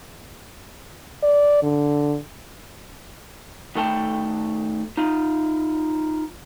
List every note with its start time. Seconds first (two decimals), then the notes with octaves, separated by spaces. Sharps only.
1.23 D5
1.63 D3
3.75 D#3 A3 A4 G5 A5
4.97 D#4 F4